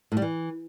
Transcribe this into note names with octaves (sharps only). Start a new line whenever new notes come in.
A2
G3
E3